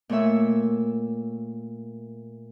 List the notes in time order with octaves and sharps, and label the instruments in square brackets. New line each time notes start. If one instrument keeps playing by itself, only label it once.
[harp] A#2 A3 A#3 C#5 E5 E6